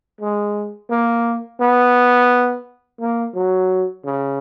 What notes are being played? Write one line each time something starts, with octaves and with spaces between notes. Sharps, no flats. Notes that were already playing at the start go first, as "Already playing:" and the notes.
G#3
A#3
B3
A#3
F#3
C#3